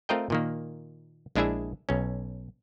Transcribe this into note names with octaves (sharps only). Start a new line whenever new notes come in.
A3 C4 F4 A#4 D#5 G5
A#2 D#3 A#3
A#1 G#3 D4 E4 G#4 E5
B1 C#4